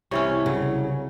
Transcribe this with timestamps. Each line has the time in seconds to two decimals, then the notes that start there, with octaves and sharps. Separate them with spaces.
0.11 C2 C3 E3 C#4 E4 C#5 C#6
0.46 C#3 F#3